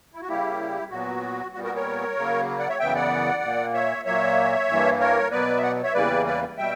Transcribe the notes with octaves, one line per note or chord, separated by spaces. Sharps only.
E4
F#4
C#3 G3 A#3 E4 G4
A#2 F#3 B3 F#4
A#2 G3 B3 F#4
F#4 A#4
A#4 C#5
C#3 F#3 A#3
D5 F#5
C#5 E5
F#2 C#3 E3 B3 E5 G5
D5 F#5
A#2 A#3
C#5 E5
A#2 F#3 A#3 C#5 E5
G2 E3 A#3
A#4 C#5
B2 F#3 B3 B4 D5
E5
D5 F#5
C#5 E5
E2 C#3 E3 G3 A#3 B4 D5
B4 D5
B2 G3 E5 G5